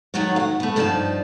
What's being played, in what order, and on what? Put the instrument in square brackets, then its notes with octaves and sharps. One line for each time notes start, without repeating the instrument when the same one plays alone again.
[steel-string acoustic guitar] D#3 F#3 A3 F#4 A4 C#5
F5 F#5
A3 B3
G2 F3 D#4 D5 G#5 A5